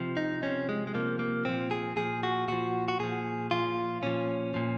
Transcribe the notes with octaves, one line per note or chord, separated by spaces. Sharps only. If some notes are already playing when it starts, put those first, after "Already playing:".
Already playing: C3 F3
D#4
C3 F3 C#4
G#3
G#3
C3 F3 A#3
A#3
A#2 F3 C4
G#4
A#2 F3 G#4
F#4
A#2 F3 F#4
F#4
A#2 F3 G#4
A#2 F3 F4
A#2 F3 C#4
A#2 F3